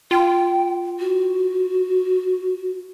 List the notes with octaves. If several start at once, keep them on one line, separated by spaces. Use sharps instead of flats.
F4 G5
F#4